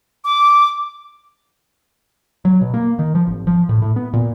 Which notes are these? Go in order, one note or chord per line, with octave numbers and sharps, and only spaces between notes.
D6
F#3
B2
A#3
D#3
F3
G#1
F3
A2
A2
B3
A#2